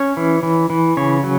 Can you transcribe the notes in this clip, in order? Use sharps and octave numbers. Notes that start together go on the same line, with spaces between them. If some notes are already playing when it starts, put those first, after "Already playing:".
Already playing: C#4 C#5
E3
E3
E3
C#3 C#5
F#3